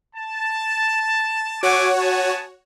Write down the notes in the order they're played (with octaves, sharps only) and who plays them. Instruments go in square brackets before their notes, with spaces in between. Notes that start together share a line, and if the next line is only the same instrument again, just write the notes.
[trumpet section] A5
[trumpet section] A3 G#5 D6 [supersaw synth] F#4 C#5 F#5
[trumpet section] B3 G#5 A5